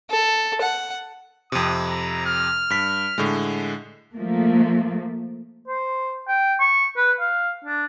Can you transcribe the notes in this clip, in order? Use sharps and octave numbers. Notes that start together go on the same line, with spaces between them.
A4
F#5
F2 C3 D#6
A#5
F6
G2 B6
A2 D3 G#3
F3 A3 A#3
C5
G5
C#6
B4
F5
D4